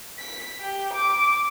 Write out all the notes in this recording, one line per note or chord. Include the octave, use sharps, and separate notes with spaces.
B6
G4
D6